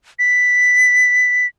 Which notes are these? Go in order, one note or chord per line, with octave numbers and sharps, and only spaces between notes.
B6